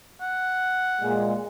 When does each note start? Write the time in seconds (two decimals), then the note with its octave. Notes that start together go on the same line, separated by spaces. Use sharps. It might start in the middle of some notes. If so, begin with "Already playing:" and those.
0.21 F#5
1.01 A#2 G#3